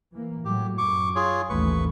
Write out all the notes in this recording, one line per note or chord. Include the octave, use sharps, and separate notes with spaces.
E3 A#3
A2 F#3 G4
F#2 C#6 D6
F4 G#4 C#5
A1 D#2 A3 B4 C#6